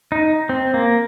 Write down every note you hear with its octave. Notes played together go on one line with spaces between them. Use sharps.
D#4
C4
A#3